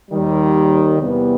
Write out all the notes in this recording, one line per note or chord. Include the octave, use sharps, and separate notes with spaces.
D#2 D#3 G3
E2 C3 E3 G3 B3